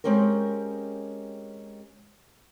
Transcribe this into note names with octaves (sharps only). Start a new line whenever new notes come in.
G#3 C4 C#4 G4 A#4